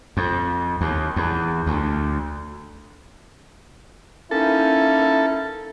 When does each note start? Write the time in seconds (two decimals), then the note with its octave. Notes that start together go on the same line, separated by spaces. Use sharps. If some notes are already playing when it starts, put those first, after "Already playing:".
0.17 F2
0.81 D#2
1.16 E2
1.66 D2
4.31 A#3 C#4 D#4 E4 A4